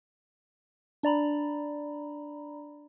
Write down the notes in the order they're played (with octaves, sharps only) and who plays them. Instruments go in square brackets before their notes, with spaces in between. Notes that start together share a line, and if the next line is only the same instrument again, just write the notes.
[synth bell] D4 D5 A#5 B5